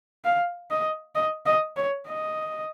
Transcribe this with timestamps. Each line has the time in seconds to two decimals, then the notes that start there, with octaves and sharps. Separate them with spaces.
0.25 F5
0.71 D#5
1.15 D#5
1.46 D#5
1.77 C#5
2.08 D#5